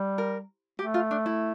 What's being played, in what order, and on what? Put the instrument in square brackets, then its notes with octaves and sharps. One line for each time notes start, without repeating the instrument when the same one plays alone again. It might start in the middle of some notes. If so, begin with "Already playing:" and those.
Already playing: [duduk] G3
[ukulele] A#4
[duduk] A3 [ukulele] G4
[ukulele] F4
D4
E4